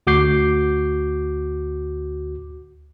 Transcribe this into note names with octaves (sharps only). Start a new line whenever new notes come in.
D2 F#4 D6 G6 C7